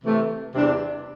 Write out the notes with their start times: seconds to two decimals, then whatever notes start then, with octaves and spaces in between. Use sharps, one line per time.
0.02 C3 E3 A3
0.54 E2 C3 G3 D4